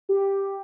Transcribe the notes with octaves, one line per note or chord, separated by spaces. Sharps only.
G4